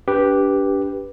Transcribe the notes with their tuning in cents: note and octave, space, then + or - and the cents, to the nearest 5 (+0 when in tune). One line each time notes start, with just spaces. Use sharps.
D4 -35 G4 +0 B4 -10